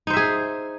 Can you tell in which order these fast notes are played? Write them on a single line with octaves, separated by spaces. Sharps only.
D#4 C5 E5 G#4